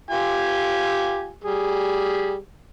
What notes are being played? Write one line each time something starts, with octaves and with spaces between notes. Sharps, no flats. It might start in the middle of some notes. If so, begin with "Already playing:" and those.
F4 G4 G#5
G3 G#4